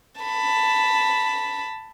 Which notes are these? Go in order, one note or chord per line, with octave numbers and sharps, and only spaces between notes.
A5 B5